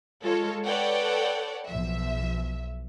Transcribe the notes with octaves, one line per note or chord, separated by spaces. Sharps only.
G#3 F4 A4 C#5
A4 B4 C#5 D5 F#5 G5
B1 F3 E5